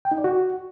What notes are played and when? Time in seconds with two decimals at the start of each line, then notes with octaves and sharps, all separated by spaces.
0.05 G5
0.12 D#4
0.18 D5
0.24 F#4